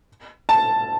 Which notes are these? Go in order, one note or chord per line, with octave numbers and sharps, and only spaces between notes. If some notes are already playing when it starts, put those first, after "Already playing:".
A5